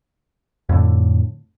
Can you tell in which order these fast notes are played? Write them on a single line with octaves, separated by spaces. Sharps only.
F2 A2 D3